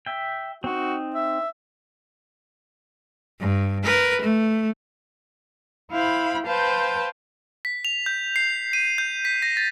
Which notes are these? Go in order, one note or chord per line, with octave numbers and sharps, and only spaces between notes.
E5 G5
C4 D#4 F#4
E5
G2
A#4 B4
A3
E4 C5 F5 G5 B5
B4 C5 F5 G5 A5 G6
B6
F7
G6
C7
D#7
G6
B6
A#6
A6